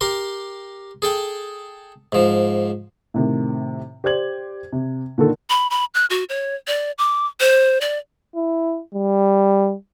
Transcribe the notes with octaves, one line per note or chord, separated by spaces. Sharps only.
G4 A#4 C6
G#4 A4 G5
G#2 F3
A2 C3 D#3
G4 C5 D5 G#6 F#7
C3
A#2 D3 D#3 A4
B5
B5
F#6
F#4
C#5
D5
D6
C5
D5
E4
G3